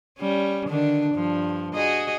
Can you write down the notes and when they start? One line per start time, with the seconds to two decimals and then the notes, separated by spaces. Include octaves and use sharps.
0.19 G3 C#4
0.68 D3 D#3 D4
1.14 G2 F3
1.74 F#4 G#4 D#5